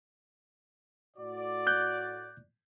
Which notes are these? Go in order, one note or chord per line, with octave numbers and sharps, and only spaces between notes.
A2 F#4 D5
F#6 G6